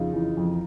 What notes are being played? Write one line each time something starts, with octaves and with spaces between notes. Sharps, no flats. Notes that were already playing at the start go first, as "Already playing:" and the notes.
Already playing: F2 C#3 D#4 F4
E3
F2